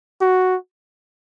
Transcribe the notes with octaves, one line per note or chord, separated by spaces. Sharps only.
F#4